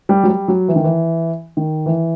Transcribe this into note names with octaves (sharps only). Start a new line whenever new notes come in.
G3
F#3
G3
F#3
E3
D#3
E3
D#3
E3